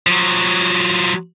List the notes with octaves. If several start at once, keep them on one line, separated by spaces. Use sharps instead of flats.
F3 F#3